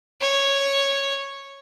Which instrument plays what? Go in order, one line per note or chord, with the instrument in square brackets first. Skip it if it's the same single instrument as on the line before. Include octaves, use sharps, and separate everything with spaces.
[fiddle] C#5